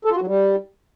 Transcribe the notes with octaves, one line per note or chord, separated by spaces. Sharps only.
A4
F4
F#4
F#3
G3